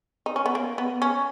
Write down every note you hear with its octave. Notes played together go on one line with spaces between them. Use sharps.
D#4
C#4
B3
A#3
B3
C#4